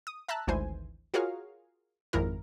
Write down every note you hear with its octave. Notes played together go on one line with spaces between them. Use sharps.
D#6
E5 A5 A#5 E6 F#6
G#1 D2 G#2 E3 C5 G#5
F4 F#4 G#4 A#4 C#5 F5
G#1 F2 D#3 E4 A#4